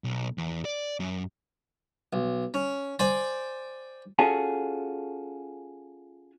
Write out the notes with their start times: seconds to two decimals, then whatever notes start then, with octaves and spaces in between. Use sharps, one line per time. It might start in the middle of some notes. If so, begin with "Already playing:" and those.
0.04 B1
0.38 E2
0.65 D5
1.00 F#2
2.13 B1
2.54 C#4
2.99 C5 D5 G5 G#5
4.19 C#4 F4 F#4 G#4 A4